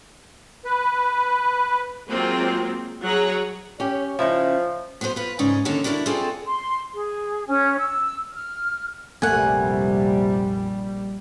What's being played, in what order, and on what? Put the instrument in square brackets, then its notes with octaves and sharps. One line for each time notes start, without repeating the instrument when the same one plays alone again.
[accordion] B4
[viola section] F#3 G#3 A#3 C4 F4
F#3 G#4 C#5 F#5 A#5
[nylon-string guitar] C#4 G4 [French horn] C#5
[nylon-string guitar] C#3 C#4 [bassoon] F3 [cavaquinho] D#4 E4
[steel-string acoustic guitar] F3 B3 F#4 A4 C5
F4 B4
G#2 C#3 C#4 D#4 G#4 D5
D3 D#3 A#3 C#4 A5
D4 E4 F#4 A#4 D5
C4 F4 F#4 G#4 A4 D5
[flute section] C6
G#4
C#4
E6
F6
[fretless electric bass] F1 A3 A#3 [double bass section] A#1 G3 [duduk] C3 [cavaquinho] F#5 G#5